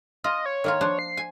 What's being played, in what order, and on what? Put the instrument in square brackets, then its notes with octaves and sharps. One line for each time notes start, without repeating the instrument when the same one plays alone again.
[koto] F4 [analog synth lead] D#5
[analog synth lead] C#5
[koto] D#3 A#3 F4
F3 D4 C5
[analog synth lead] C7
[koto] G#5